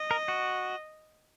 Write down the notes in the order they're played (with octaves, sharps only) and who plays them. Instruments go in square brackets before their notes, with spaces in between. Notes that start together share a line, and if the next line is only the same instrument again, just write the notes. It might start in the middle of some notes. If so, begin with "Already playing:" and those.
Already playing: [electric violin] D#5
[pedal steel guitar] A#4
F#4